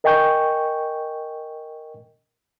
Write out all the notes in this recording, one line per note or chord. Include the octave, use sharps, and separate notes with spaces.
A#4 D#5 G5 G#5 C#6 G6